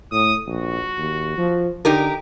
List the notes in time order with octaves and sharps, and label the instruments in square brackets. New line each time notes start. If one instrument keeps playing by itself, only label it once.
[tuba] A2 [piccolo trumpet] D#6
[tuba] A#1 [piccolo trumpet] F#4
[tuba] D#2
F3
[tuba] D3 [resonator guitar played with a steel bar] D#4 G4 A#4